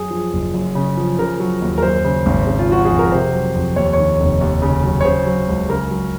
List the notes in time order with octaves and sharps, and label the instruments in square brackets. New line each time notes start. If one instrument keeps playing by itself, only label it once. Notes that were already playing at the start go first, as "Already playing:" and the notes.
Already playing: [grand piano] F#2 G#4
F3
F#1
F#2
C#3
F3
C#3 A#4
F#3
D#2
A#4
F#2 C5
C#3
G#1
C#3
F4
F3 F#4
G#4
F2
A#4
C3 C5
F#3
F2
D#2 C#5
D#3 C#5
F1
D#2
C#3
F#3
C#5
C#3 C5
F#3
C#2
C#3 A#4
F#3